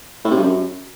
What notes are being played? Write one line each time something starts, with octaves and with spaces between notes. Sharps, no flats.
A2
C3
G2
F#2